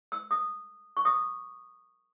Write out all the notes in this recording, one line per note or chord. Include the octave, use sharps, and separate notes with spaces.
E6
D#6
C#6
D#6